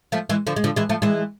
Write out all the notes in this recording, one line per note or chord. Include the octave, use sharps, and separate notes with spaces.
F3 A3
E3 G#3
D3 F3
G#3
D3 F3
E3 G#3
F3 A3
E3 G#3